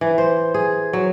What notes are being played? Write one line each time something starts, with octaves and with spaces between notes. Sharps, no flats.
E3
C5
G#4
F#3